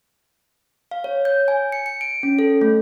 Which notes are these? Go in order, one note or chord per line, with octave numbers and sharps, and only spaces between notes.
F5
C#5
G6
G#5
C#7
C#7
D7
C#4
A4
A3